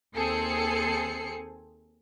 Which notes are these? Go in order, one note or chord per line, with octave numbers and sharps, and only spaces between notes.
D#2 C4 G#4 A4 C7 C#7